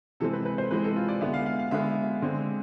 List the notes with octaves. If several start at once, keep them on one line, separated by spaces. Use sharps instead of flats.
C3 E3 G#3 C4 A4
B4
B4
C5
C3 E3 G#3 C4 B4
A4
F4
D5
D3 G#3 B3 E5
F5
F5
F5
D3 G#3 B3 E5
D3 G#3 C4